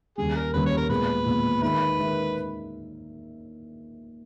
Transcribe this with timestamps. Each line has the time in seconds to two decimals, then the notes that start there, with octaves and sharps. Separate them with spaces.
0.18 D#2 C#3 G3 G#4
0.36 A#4
0.53 D#2 C#3 G3 B4
0.66 C#5
0.77 A#4
0.89 A#2 G#3 B3 B4
1.26 A#2 G#3 B3
1.62 D#3 G#3 D#4 A#4 B4 E5
1.98 D#3 G#3 D#4 A#4 E5